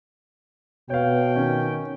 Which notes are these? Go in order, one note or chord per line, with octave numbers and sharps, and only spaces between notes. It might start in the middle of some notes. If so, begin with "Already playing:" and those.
B2 B3 C#5 F5 G5
D#3 C#4